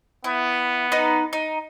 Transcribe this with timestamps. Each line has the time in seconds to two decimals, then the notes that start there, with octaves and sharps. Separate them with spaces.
0.24 B3 E4
0.92 D#4 B4
1.33 D#4